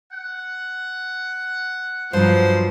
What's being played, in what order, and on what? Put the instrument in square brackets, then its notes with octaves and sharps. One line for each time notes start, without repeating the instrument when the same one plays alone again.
[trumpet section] F#5
[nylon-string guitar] G2 F#3 [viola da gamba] F3 [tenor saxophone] C5